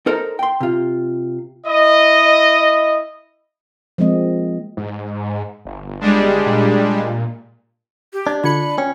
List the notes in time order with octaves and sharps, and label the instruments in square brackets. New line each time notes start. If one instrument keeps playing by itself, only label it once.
[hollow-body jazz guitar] D#4 A4 A#4 C5
G5 C6
C3 F4
[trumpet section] E4 D#5
[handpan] F3 G#3 A#3 C4 D#5
[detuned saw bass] G#2
G1
[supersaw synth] G3 G#3 D4
[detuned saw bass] A#2
[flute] G4
[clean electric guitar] D4 [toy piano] D#5
[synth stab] D3 C#7 [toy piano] F4 D5 [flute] B5
[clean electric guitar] C#4 [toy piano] G5